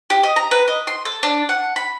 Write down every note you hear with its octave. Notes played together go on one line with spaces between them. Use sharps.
G4
D#5
A#5
B4
D#5
C6
A4
D4
F#5
B5